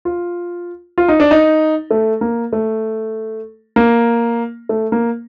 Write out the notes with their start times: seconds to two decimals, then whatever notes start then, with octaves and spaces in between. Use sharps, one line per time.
0.05 F4
0.98 F4
1.08 D#4
1.20 D4
1.31 D#4
1.91 A3
2.21 A#3
2.53 A3
3.76 A#3
4.69 A3
4.92 A#3